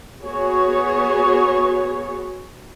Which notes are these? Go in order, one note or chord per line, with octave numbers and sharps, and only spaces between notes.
B3 F#4 G#4 C#5